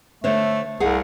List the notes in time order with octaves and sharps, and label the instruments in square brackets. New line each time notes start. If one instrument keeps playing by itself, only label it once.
[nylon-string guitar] D3 C5 C#5 [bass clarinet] A3
[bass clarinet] C2 [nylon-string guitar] G#4 F5 F#5